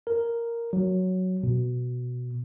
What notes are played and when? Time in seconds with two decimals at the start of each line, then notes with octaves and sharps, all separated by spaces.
0.07 A#4
0.73 F#3
1.43 B2